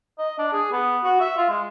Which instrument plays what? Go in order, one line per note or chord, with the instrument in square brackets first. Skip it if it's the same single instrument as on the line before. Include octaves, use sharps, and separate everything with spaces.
[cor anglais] D#5
D4
G#4
B3
F#4
E5
F4
G#3